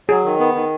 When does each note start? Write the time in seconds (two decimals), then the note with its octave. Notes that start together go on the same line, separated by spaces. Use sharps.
0.09 F#3 G#4
0.25 D#3
0.39 B3
0.55 D#3